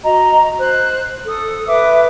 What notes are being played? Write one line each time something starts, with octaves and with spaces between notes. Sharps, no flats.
F#4 D#5 A#5
C5 F#6
A4 D#6
B4 E5 D6